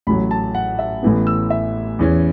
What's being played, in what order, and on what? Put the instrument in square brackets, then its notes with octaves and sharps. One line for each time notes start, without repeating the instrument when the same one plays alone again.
[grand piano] A1 A2 F#3 B5
A5
F#5
E5
A1 A2 E3 B3
E6
E5
E2 E3 C#4